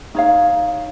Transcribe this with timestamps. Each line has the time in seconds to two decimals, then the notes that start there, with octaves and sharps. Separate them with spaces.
0.15 D#4 C#5 F5